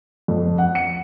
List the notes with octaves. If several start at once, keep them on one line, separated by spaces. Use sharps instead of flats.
F2
F#5
C#7